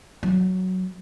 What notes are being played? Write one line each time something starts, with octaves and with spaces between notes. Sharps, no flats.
F#3